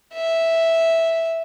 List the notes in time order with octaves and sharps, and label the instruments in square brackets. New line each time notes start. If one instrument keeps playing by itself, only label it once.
[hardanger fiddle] E5